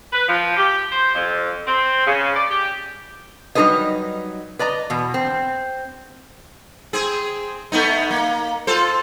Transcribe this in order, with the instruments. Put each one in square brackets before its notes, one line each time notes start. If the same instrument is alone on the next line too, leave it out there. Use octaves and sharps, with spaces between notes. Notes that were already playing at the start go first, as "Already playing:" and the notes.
[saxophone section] B4
F3
G4
C5
F2
C4
C#3
D5
G4
[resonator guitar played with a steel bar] F#3 G3 D#4 A4 B4 D#5
B4 D5 D#5 A#5
E2 B2
C4
[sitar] C4 G#4
A3 B3 D#4
A#3
F4 A4 C5